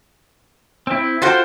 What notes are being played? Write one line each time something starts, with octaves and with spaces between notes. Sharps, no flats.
C4 E4
F4 F#4 A4 C5 G5